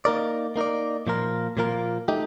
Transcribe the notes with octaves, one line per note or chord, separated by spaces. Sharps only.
A#3 D#4 A#4 D5
A#3 D#4 A#4 D5
A#2 F3 A#3 F4 A#4
A#2 F3 A#3 F4 A#4
A3 D#4 G4